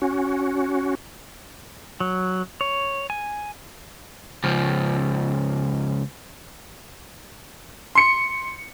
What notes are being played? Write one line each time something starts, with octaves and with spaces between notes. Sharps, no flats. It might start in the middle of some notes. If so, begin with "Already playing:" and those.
C#4 F#4
F#3
C#5
G#5
C#2 F3
C6 C#7